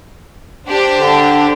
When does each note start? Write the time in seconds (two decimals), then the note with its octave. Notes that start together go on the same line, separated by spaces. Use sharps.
0.68 D4 G4 C5
0.97 D3